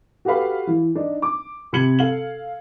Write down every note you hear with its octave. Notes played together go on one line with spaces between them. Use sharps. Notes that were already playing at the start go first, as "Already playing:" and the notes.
F#4 G4 A4 B4 F5 B5
E3
D4 D#4
D6
C3 C4 B5 G#6 C#7 F#7
A4 F5 F#7